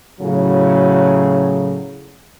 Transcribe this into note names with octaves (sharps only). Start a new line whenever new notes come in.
A2 C#3 F#3